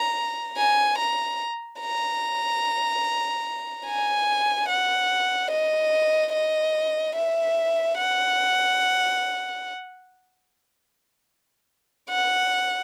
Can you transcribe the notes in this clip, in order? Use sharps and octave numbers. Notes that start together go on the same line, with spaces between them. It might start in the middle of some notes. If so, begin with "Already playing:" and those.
Already playing: A#5
G#5
A#5
A#5
G#5
F#5
D#5
D#5
E5
F#5
F#5